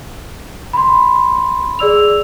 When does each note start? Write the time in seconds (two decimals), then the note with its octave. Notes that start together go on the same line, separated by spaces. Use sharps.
0.73 B5 C6
1.79 G#4 D5 E6 F7